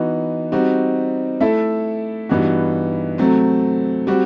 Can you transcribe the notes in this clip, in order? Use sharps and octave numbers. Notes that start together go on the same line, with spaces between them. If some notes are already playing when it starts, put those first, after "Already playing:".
Already playing: E3 B3 D#4 F#4
G3 C4 D#4 F#4
A3 E4 A4 E5
G2 E3 B3 D#4 F#4
C3 F#3 A3 C4
G3 C4 F#4